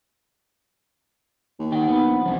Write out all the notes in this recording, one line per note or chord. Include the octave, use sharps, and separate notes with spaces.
D#2
D#3 D#4 F#5 G5
B3 F#5 B5
A#1
C2 B2 E3 F3